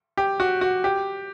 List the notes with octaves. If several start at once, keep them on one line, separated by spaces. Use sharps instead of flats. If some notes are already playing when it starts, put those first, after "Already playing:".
G4
F#4
F#4
G4